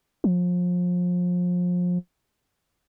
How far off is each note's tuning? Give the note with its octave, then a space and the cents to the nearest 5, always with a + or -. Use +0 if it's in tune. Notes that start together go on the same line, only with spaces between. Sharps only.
F3 +30